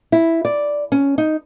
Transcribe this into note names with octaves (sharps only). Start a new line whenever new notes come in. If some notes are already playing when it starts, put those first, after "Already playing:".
E4
D5
C#4
D#4